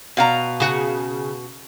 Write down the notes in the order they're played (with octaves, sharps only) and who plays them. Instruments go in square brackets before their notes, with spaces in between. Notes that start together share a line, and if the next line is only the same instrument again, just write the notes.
[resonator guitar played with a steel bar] B2 F5 A#5
[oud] C#3 F#4